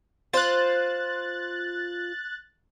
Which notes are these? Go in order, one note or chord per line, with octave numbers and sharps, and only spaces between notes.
F4 C5 F#6 A6